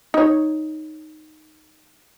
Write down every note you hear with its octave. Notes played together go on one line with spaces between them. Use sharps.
D#4 C#5